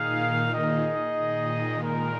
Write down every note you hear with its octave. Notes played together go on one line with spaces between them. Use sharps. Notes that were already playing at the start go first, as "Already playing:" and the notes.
Already playing: A#2 D#3 D#4 G#4 F5
D#4 G#4 D#5
A#2 D#3
G#3 D#4 A#4